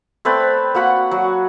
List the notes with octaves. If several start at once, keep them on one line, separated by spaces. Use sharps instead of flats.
A3 C4 B4 D5
A#3 F#4 F#5 B5
F#3